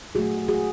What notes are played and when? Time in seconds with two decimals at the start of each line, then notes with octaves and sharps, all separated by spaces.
0.15 A#2 F#3 A3 F#4 G#4
0.48 F#4 G#4